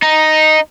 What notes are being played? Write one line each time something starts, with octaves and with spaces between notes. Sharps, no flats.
D#4